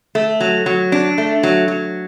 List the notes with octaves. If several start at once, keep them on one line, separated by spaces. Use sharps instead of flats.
A3
F#3
F#3
D4
A3
F#3
F#3